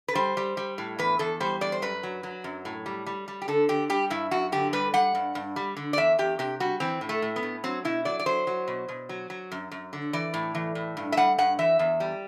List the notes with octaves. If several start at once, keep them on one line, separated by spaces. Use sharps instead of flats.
B4
G3 C5
G3
G3
A2
E2 B4
E2 A4
G3 C5
E2 D5
C5
F#2 B4
F#3
F#3
F#2
A2
G3
G3
G3
G4
D3 A4
D3 G4
G3 G4
G2 E4
F#2 F#4
D3 G4
G3 B4
G3 F#5
G2
G2
G3
D3
D5
E2 E5
E2 G4
C3 G4
G3 F#4
E3 C4
A2
A3
A2
B3
A2
F#3 C4
B2 E4
F#3 D5
D5
F#3 C5
F#3
B2
B2
F#3
F#3
F#2
F#2
D3
E3 D5
A2
E3
A2
G2
E5
G3 F#5
G2 F#5
E3 E5
E2
G3